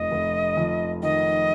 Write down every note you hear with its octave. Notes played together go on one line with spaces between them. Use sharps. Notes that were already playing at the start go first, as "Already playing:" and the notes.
Already playing: F1 F2 D#5
F1
F2
D#3 D#5